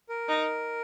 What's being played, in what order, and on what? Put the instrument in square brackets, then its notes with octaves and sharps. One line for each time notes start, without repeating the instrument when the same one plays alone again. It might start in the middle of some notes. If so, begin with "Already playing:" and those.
[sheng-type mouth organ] A#4
[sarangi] D#4